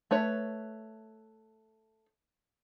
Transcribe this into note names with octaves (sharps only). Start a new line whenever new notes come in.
A3 B4 C#5